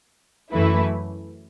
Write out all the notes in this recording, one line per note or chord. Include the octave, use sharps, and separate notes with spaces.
F#2 E3 A3 E4 B4